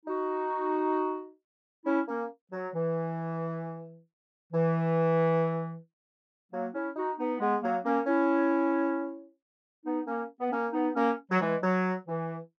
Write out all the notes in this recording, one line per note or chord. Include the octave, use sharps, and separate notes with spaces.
D#4 F#4
C#4 E4
A#3 C#4
F#3
E3
E3
F#3 A#3
C#4 E4
D#4 F#4
B3 D#4
G#3 B3
F#3 A#3
A#3 C#4
C#4 E4
B3 D#4
A#3 C#4
B3
A#3 C#4
B3 D#4
A#3 C#4
F#3
E3 G#3
F#3
E3